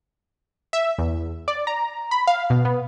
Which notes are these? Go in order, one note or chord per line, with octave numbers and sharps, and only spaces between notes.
E5
E2
D5
A#5
B5
F5
B2
B3